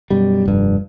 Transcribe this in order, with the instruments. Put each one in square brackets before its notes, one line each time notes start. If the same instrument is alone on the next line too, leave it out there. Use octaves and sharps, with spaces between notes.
[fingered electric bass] F#2 B2 G3
F1 G2